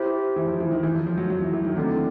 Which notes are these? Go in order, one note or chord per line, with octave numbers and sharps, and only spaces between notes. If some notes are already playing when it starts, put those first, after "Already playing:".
Already playing: E4 G4 C5 E5
E3
F3
E3
D#3
E3
F3
F3
F#3
F#3
E3
E3
D#3
D3 A3 C4 D#4